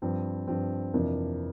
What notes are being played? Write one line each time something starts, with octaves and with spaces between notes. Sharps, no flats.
G2 F3 C4
G2 F3 C4
F2 C3 E3 A#3 D4